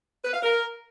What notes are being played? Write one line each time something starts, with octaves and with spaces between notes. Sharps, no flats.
B4
F5
A#4